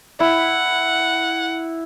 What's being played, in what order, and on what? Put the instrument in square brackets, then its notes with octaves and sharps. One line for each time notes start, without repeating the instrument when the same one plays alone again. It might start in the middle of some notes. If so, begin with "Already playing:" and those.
[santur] E4 [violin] F#5